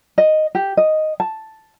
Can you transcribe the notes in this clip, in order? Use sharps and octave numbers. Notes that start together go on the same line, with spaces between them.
D#5
G4
D#5
A5